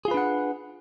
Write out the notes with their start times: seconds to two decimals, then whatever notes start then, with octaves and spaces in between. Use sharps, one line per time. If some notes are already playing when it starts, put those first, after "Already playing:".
0.05 G#4
0.08 F4
0.11 B4
0.14 D4
0.17 F#5